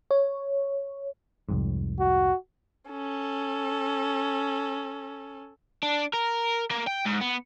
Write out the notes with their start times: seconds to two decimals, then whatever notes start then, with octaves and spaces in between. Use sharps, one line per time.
0.11 C#5
1.49 C2 F2 G#2
2.00 F#4
2.91 C#4 A4
5.83 D4
6.13 A#4
6.71 A#3
6.87 G5
7.06 G#2
7.22 B3